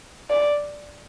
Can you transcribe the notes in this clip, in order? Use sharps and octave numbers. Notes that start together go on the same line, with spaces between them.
D5